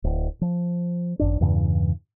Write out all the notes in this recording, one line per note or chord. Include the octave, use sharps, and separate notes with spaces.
D1
F3
G#1 F#2 D4
E2 G2 C#3 E3